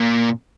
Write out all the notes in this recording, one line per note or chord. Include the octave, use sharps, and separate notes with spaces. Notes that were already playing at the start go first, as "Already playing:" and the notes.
Already playing: A#2